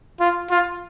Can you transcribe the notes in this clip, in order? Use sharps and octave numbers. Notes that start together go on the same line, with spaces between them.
F4
F4